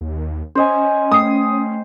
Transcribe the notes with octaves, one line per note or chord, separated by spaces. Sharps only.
D#2
C#4 C5 D#5 G#5 C6
A3 G5 D#6 C7